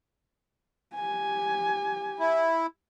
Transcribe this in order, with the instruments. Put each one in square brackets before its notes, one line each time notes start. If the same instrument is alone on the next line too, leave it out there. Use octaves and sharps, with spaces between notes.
[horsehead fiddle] G4 G#5
[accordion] E4